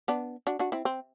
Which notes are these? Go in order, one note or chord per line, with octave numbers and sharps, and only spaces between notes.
B3 D4
D4 F#4
D4 F#4
C4 E4
C4